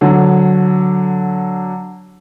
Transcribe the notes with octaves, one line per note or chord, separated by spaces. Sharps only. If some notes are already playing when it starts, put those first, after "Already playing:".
D3 F#3